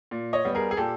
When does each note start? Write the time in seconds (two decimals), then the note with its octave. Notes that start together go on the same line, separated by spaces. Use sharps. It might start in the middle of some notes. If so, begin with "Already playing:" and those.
0.11 A#2
0.33 C#5 D#5
0.45 G3 B3
0.55 G#4 A#4
0.71 G#4
0.77 A#2 G4 A4